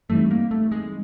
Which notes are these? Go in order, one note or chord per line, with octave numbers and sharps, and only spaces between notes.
G2 E3 G3 A3 C4 D#4
A#3
A3
G#3